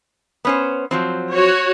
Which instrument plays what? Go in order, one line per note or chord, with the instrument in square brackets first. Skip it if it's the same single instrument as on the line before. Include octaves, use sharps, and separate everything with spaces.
[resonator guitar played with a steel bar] B3 C#4 C5
F3 F#3 C4
[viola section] F#4 C#5